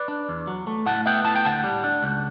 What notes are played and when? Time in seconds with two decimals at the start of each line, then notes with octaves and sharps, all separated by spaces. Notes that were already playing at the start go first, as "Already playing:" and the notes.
Already playing: B4 D5
0.08 D4
0.29 E2
0.47 F#3
0.67 A3
0.86 A2 F#5 A5
1.06 B3 E5 G5
1.25 A2 A5
1.36 G5
1.45 D2 F#5 A5
1.64 G3
1.84 D4
2.03 C#2